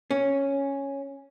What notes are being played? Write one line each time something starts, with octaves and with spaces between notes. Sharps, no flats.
C#4